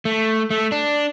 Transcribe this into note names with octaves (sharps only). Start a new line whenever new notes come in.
A3
A3
D4